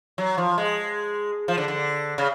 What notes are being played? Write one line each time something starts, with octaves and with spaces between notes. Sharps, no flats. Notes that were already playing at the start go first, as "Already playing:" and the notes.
F#3
F3
G#3
F3
D3
D3
C#3